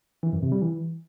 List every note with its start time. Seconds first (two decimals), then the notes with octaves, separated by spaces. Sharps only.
0.23 E3
0.33 F#2
0.42 C3
0.52 G3
0.62 E3